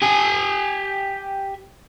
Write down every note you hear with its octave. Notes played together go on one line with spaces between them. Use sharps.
G4 G#5